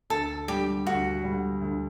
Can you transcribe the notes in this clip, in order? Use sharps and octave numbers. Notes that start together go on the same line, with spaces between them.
D2 A4
D3 G3 G4
D2 F#4
D3 G3
D2